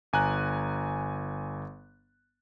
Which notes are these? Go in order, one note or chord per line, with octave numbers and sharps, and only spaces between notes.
G1 G#5 A#5 F#6